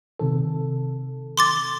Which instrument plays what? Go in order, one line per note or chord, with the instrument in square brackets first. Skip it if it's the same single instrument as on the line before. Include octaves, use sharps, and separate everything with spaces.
[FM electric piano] C3 D#3 A4
[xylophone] C6 D6 A6